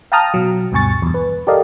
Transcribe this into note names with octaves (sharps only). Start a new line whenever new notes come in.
F5 G5 A5 A#5 D#6 F6
B2 F#3
D2 G2 B2 G#5 C#6 A6
E2 G2
B4
G4 A4 A#4 D5 D#5 F5